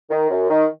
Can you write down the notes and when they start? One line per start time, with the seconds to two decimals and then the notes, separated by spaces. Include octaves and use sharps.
0.11 D#3
0.30 F#2
0.50 D#3